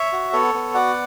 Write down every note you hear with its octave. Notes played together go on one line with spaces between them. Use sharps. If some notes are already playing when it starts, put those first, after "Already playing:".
Already playing: C#5 E5
F#4
B3 A4 C#5
B3
F#4 D5 F#5